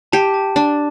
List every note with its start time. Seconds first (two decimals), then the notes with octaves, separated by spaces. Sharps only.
0.13 G4 A5
0.34 A5
0.56 D4 A5